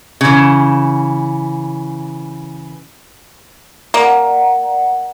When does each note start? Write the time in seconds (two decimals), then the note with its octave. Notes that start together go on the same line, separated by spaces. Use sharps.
0.21 C#3 E3
3.94 A#3 D5 F#5